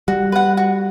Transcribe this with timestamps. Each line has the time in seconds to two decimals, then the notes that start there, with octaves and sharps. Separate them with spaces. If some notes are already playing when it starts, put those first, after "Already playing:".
0.08 G3 F#4
0.32 B4 F#5
0.57 F#4